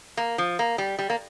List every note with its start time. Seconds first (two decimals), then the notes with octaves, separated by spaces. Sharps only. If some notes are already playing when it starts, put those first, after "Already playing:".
0.17 A#3
0.38 F3
0.59 A#3
0.78 G3
0.99 G3
1.10 A#3